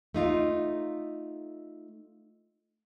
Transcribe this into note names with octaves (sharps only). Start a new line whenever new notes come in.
A3 D#4 F4